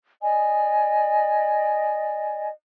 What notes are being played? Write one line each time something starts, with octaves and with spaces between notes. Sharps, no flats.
D5 D#5 G#5